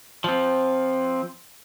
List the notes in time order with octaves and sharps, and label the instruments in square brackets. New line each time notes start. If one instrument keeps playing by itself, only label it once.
[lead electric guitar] F3 C4